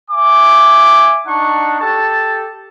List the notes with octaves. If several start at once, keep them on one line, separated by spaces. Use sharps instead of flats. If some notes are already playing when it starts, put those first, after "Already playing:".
E5 G#5 D6
D4 D#4 F#5 A5 C#6
G4 A4 A5